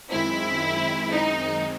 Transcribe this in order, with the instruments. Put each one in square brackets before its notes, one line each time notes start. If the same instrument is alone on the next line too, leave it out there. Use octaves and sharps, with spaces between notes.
[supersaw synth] F#2 D#3 G#3 C4 [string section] E4
[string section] D#4